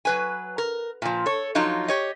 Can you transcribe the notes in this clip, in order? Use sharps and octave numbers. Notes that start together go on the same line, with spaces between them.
F#3 B4 G#5
A#4
A#2 F3
A4 C#5
F3 F#3 D#4 F4
G4 C#5 D#5